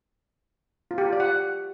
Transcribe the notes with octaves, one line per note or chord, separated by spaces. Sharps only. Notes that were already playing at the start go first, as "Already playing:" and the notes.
F4
G4
F4
D5
F#5